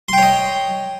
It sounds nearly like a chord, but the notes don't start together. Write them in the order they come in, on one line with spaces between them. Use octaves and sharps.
C6 G5 C#5 D#5